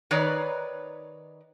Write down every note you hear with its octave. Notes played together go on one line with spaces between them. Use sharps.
D#3 D#4 B4 C#5 D5